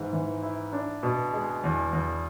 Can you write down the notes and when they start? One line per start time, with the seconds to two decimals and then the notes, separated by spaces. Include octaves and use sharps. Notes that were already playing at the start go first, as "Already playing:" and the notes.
Already playing: G#2 E3
0.13 E3
0.42 E4
0.73 D4
1.03 B2
1.33 G#3
1.64 E2
1.93 E2